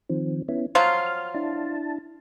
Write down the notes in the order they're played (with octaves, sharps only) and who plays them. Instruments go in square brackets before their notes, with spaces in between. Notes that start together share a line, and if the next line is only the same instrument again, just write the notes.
[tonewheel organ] D#3 F3 C4
B3 C#4 E4
[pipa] F3 F#3 F4 [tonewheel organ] C6 F6
[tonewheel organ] F6
D4 E4 A5